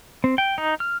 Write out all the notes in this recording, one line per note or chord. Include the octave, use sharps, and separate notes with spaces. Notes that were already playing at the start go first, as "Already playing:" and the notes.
C4
G5
D#4
F6